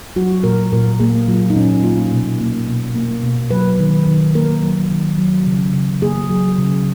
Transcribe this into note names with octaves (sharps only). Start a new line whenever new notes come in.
F#3 F#4
A#2 A#4
A#2 A#4
A#3 G#4
F#3 F4
D#4
A#2 C#4
A#3 F4
B2
A#3
B2
A#3
B2
F#3 B4
D#3
D#3
A#3 A#4
F#3
D#3
F#3
C#3
C#3
A#3 G#4
F#3
C#3